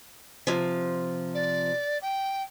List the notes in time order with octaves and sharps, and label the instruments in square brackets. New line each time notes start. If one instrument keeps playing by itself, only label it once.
[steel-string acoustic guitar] C3 F3
[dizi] D5
G5